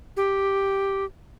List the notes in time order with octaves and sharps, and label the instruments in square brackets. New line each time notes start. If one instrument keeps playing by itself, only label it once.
[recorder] G4